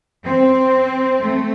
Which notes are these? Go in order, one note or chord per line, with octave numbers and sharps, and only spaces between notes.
C4
A3